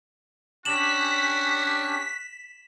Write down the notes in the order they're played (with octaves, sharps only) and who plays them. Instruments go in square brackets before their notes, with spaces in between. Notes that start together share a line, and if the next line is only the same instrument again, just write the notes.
[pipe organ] C#4 D4 G4 [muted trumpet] F#4 [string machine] B6 [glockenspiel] E7 F#7